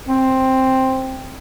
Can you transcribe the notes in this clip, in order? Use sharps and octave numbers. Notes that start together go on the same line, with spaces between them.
C4